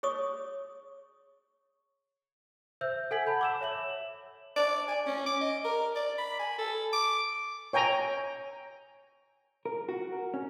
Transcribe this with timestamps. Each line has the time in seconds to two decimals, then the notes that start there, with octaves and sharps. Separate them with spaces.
0.03 G#4 C#5 C#6 D#6
2.81 C5 E5 E6 G6
3.11 A4 F#5 G#5 G#6 B6 F#7
3.26 A5 B5 G6
3.41 D6 E6 E7
3.61 C#5 E5 E7 F#7
4.56 D5
4.88 G#5
5.06 C#4
5.26 D6
5.41 D#5
5.65 A#4
5.96 D5
6.18 B5
6.39 G#5
6.58 A4
6.93 D6
7.73 C#5 G5 G#5 A#5
9.65 A#4
9.89 F#4
10.12 A#4
10.34 C#4